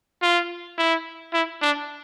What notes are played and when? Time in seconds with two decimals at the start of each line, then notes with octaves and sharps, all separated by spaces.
0.22 F4
0.78 E4
1.34 E4
1.62 D4